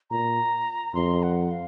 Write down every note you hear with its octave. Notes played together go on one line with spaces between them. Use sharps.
A#2 A#5
F2 C6
F#5
F5